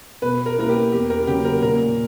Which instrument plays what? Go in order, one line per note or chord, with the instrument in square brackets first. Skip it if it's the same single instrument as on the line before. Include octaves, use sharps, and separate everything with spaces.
[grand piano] B2 [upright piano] B4
[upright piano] A#4
[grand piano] A#3 C#4 E4 B4 [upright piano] A#4
[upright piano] G4
[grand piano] E2 [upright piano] G4
[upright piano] A#4
[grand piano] C#3 F#3 A#3 [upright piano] G4
[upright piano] A#4
[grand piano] A#2 [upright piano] A#4